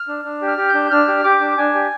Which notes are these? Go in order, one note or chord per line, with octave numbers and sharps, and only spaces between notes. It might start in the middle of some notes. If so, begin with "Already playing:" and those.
Already playing: F6
D4
D4
G4
F6
G4
G6
D4
D4 F6
G4
G4 D6
D4
D4 G#5
G4